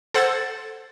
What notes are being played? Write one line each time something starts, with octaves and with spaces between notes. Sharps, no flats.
A4 C5 F#5 E6 G#6 A6